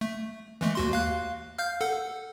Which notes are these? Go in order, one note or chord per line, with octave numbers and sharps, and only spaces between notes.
A3
E3 G#3 A3
D#2 F#4 C6
D#2 F5 F#6
F5 F6 G6
A4 F#5